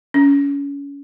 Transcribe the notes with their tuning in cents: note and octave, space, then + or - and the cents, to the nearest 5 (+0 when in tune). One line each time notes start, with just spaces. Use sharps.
C#4 +30